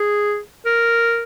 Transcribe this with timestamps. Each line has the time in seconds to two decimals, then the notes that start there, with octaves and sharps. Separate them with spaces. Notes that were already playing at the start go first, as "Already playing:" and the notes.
Already playing: G#4
0.66 A#4